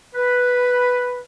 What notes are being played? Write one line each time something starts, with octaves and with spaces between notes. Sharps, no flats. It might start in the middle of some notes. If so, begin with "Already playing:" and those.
B4